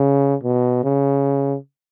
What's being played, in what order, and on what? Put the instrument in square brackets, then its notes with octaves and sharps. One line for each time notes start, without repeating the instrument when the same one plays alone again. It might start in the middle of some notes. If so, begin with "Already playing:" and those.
Already playing: [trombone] C#3
B2
C#3